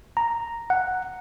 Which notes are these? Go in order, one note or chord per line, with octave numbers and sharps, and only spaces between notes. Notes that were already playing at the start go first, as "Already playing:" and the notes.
A#5
F#5